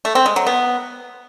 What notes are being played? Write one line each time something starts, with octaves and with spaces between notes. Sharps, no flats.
A3
C4
G#3
F#3
B3